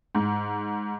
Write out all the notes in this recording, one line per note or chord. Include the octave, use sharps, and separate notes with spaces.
G#2